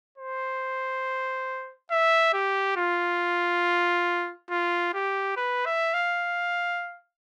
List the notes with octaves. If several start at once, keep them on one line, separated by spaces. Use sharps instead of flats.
C5
E5
G4
F4
F4
G4
B4
E5
F5